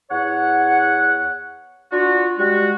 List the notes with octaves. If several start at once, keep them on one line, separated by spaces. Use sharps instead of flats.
E2 C#5 F#5
D4 F4 F#4
G3 G#3 F#4